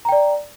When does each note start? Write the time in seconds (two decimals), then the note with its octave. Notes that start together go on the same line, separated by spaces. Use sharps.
0.05 A#5
0.09 G5
0.12 D5